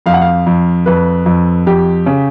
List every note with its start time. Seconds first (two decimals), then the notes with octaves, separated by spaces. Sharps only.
0.06 F2 F5
0.14 F#5
0.21 F5
0.46 F2
0.86 F2 B4
1.26 F2
1.66 F2 G4
2.06 C#3